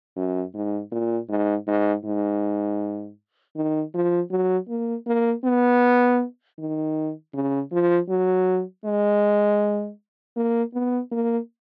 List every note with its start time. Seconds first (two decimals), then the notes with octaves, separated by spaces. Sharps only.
0.16 F#2
0.54 G#2
0.92 A#2
1.29 G#2
1.67 G#2
2.04 G#2
3.56 D#3
3.94 F3
4.31 F#3
4.69 A#3
5.07 A#3
5.44 B3
6.59 D#3
7.34 C#3
7.72 F3
8.09 F#3
8.85 G#3
10.36 A#3
10.74 B3
11.12 A#3